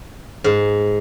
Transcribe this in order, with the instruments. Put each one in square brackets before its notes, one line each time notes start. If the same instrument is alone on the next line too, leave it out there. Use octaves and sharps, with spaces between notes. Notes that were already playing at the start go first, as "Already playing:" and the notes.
[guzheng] G#2